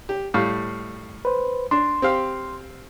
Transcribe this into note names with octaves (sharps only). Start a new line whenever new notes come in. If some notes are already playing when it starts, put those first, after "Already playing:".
G4
A2 G3 F5
B4 C5
D4 C6
C4 G4 F5